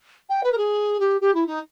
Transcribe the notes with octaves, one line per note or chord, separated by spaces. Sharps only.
G5
B4
A#4
G#4
G4
G4
E4
D#4